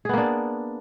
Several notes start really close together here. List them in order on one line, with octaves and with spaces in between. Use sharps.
G#4 B3 A#3 D4